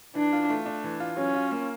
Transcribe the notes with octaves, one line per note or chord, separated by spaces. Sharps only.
E3 D4
F4
A3
D4
E3
F4
F#3 C#4
F4
A#3